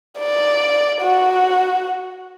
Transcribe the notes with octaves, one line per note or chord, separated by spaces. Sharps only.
D5
F#4